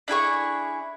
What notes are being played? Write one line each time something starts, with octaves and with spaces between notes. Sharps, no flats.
D4 E4 G#4 C#6